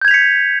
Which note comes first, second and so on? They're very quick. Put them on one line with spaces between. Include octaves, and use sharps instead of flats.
G6 G#6 F7 B6 C#7